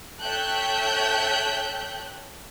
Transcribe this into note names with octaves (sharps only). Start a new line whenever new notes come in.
A4 C#5 E5 G5 F#6 G6